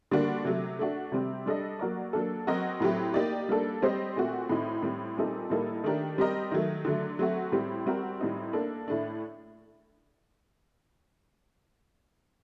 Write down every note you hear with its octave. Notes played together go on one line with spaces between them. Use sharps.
D3 G3 A#3 D4 F#4
C3 F#3 A3
A3 D4 F#4
C3 G3 C4 G4
G3 D4 A4 D#5
F#3 A#3 F#4 A#4 D5
F#3 A#3 D4 A4
F#3 C4 F#4 A#4 D#5
A2 F#3 A3 C4 G4
A#3 D#4 G4 D5
G3 A#3 D4 A4
G3 C4 G4 C5 D#5
A#2 A3 C4 F#4
A2 A3 C4 D#4
A2 G3 C4
A#2 G3 C4 D#4 A4
A2 G3 A#3 D#4 A4
D#3 A3 D4 G4 A#4
G3 C4 G4 A#4 D#5
D#3 F#3 A3
D3 F#3 A3
F#3 A3 C4 F#4
A2 G3 C4 G4
G3 C4 F#4 A#4
A2 G3 C4 D#4
A#3 D4 A4
A2 A3 D4